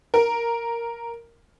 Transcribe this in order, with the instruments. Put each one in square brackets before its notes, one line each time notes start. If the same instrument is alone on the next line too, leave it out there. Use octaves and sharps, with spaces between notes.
[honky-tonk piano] A#4